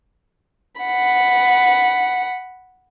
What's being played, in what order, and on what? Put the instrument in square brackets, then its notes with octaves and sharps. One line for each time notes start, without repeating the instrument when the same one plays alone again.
[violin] F#5 B5